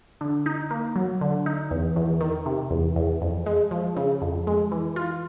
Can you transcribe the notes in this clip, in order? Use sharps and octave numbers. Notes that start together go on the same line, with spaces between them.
D3
D#4
A#3
F#3
D3
D#4
E2
E2
D#3
C3
E2
E2
F2
G#3
F3
C#3
F2
G#3
E3
F4